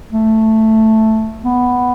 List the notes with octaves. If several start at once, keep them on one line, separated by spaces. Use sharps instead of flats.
A3
B3